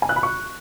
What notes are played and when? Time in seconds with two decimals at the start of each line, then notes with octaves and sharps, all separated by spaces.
0.02 G#5
0.09 F#6
0.16 B5
0.23 C#6